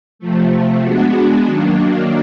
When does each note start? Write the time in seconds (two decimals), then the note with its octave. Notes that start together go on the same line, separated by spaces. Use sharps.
0.19 C3 F3 A3
0.83 G#3 B3 D4 F#4
1.46 D#3 F#3 A#3 D4